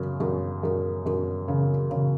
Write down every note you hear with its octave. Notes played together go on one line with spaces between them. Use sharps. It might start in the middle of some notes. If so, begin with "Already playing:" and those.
Already playing: F#2 C#3
F#2
F#2
F#2
C#3
C#3